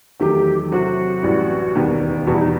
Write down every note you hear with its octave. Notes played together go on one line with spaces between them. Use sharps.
E2 D#3 F#3 A3 G4
C3 F#3 C4 E4 F#4 A4
A1 A2 E3 G3
E1 D#2 D#3 G3 B3
E2 B2 G3 F#4
E4
D#4